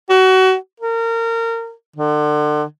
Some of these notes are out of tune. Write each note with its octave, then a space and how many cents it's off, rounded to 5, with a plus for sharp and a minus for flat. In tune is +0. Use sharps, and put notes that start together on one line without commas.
F#4 +25
A#4 -25
D3 +35